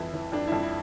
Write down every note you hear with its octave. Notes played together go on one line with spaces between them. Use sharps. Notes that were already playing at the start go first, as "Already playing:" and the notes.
Already playing: F2 E3 E4
E3
F2 D4
F2 E4
E4